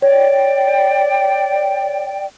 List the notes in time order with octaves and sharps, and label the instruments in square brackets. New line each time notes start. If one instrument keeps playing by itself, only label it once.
[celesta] C#5 [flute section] D5 G5